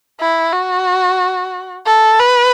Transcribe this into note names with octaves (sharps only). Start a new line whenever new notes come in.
E4
F#4
A4
B4